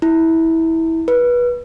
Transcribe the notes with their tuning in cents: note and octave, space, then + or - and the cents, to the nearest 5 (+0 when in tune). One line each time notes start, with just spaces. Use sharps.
E4 -20
B4 -25